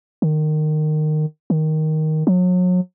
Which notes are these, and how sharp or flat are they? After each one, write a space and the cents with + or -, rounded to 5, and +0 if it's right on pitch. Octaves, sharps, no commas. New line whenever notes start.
D#3 -20
D#3 +5
F#3 -35